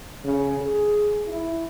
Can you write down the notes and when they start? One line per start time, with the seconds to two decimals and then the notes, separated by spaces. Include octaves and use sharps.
0.25 C#3
0.62 G#4
1.28 E4